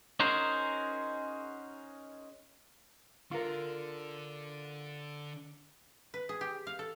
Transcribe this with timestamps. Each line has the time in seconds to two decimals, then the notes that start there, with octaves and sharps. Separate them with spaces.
0.20 C#4 D#4 F#4 G#4 A#4 C5
3.31 D3 F4 A#4
6.14 B4
6.29 G#4
6.41 G4
6.67 F5
6.79 A4